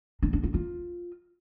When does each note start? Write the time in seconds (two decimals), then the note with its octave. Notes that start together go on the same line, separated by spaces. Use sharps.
0.23 D4
0.33 D4
0.43 F4
0.54 F4